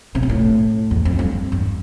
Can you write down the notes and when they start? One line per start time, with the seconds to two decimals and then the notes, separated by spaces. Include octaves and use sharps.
0.15 C3
0.23 B2
0.29 A2
0.91 E2
1.05 F2
1.19 G2
1.52 E2